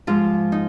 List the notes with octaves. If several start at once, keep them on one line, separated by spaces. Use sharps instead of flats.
G#2 F3 G#3 F4
D#4